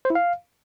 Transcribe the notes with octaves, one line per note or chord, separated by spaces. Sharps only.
C5
E4
F5